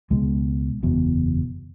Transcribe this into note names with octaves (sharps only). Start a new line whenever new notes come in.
C#2 B2 G#3
F#1 E2 B2